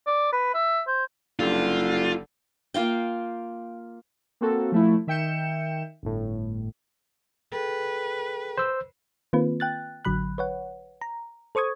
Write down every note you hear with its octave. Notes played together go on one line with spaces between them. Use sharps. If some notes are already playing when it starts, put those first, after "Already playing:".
D5
B4
E5
C5
F#1 G2 D3 F4
A#3 F4 F5 G5
A#3 C4 F#4 A4
F3 A3 E4
D#3 E5 G5 G6 C#7 E7
G1 A2
G#4 A4 B4 G5
C5 E6
D#3 A#3 C4 F4 B4
G5 F#6 A6
A1 D3 F#3 B5 F#6
B4 C#5 F#5
A#5
A4 C5 C#6 D#6 G#6